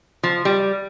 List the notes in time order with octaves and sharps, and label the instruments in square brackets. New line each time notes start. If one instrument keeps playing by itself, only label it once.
[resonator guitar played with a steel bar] F3
G3